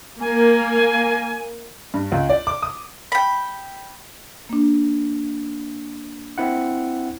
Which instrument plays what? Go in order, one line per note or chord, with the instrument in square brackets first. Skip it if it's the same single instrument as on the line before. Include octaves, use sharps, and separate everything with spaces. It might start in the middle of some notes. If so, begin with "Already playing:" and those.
[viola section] A#3 [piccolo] G#5
[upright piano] G2
C#2
D5
D6
D#6
[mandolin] G5 B5
[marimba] A#3 D4
[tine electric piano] C4 E4 F#5